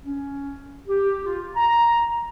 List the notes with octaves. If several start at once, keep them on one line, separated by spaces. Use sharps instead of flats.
C#4
G4
F4
A#5